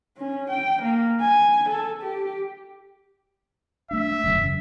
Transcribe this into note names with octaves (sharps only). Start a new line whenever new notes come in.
C#4
G5
A#3
G#5
A4
G4
A3 D4 E5
E1 F#2 C#3